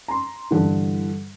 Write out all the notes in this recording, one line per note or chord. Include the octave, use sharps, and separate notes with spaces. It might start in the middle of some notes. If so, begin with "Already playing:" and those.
A#5 C6
G2 D3 E3